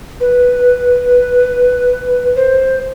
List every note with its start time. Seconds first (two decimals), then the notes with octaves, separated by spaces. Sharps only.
0.20 B4
2.36 C5